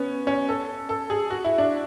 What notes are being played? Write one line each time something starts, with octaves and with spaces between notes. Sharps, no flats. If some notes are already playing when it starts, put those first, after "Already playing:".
Already playing: B3 C#4
C#4
A4
A4
G#4
F#4
E4
D4